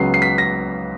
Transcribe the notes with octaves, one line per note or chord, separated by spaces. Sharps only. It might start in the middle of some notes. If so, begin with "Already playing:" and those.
Already playing: C#2 C#3 F#3 B3 C7
C7
B6
A#6